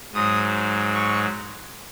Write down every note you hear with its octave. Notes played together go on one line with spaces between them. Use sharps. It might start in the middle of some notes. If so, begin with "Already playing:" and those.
G#2 F#3 D#6
C#6